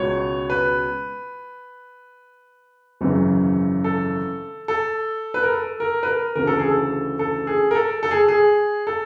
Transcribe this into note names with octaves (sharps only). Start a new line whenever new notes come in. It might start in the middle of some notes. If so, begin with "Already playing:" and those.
Already playing: C#2 B2 C#5
B4
G#1 F#2 C#3 E3
A4
A4
B4
A#4
A4
A#4
B4
A#4
D2 C#3 E3 A#4
A4
G#4
A4
A4
G#4
A#4
A4
A4
G#4
G#4
A4